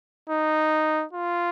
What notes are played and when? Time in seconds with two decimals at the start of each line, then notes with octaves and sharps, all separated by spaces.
0.30 D#4
1.13 F4